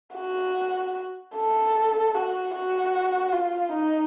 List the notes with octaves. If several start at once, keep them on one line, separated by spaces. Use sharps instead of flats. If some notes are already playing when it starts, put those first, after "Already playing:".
F#4
A4
F#4
F#4
F4
D#4